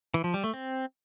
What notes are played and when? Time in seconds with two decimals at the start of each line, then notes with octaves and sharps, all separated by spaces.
0.14 E3
0.24 F3
0.34 G3
0.44 A3
0.54 C4